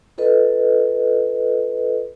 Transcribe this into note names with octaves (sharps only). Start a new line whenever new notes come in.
F4 A4 B4 D#5